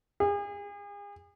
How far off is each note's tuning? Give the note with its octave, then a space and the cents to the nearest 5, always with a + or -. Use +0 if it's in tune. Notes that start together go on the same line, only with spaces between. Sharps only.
G#4 -40